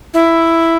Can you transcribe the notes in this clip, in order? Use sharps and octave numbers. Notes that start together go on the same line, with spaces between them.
E4